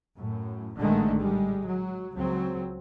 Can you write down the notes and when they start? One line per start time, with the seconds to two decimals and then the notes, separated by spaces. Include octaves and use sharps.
0.17 F#2 A2
0.78 A#1 A2 D3 D#3 G#3 A3
1.18 G3 G#3
1.65 F#3
2.15 C#2 F#3 C4